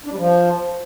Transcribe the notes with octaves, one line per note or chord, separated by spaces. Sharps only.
D4
G3
F3